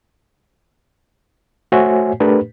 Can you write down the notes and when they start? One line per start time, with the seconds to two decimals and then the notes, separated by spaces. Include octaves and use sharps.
1.72 A3 F#4 C5 C#5 E5 G#5
2.20 A3 D4 G4 A#4 B4